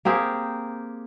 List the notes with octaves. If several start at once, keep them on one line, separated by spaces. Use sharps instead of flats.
A#3 C4 G4 G#4